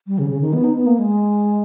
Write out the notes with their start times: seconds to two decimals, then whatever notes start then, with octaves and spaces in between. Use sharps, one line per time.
0.07 G3
0.18 C#3
0.30 C#3
0.41 D#3
0.53 B3
0.64 D#4
0.76 B3
0.86 A#3
0.99 G#3